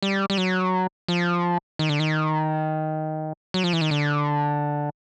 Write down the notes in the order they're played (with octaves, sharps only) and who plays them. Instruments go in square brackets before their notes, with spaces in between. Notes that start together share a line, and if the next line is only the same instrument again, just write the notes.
[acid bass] G3
G3
F#3
F3
D#3
D3
D#3
F#3
F3
E3
D#3
D3